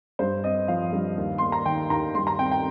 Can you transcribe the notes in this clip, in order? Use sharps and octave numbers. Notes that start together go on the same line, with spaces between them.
G2 C5
C4 D#5
F3 F5
G2
D#2
A#3 C6
A#5
D#3 G5
D#2 A#5
G2 C6
A#5
C4 G5
G5